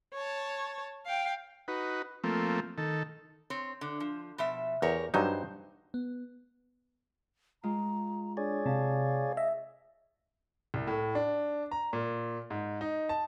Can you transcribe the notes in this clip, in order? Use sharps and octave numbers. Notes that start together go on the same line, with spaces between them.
C#5 A5
F5 G5
D#4 F#4 B4
F3 A3 A#3 C4
D#3 A4
C4 C#5
D3
F3
B2 F3 E5
E2 G4 A#4 C#5
G2 F#3 D#4 C5
B3
G#3 F4 A#5
D4 G#4 C#5 D5
C3 F5 A5
D#5 E5
C2
A2
D4
A#5
A#2
G#2
D#4
A5